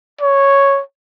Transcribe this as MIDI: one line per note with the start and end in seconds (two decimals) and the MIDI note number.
0.21 0.81 73